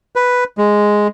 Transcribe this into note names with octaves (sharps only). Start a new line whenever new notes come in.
B4
G#3